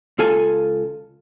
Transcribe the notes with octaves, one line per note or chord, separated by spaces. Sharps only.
C#2 F4 A4 G#5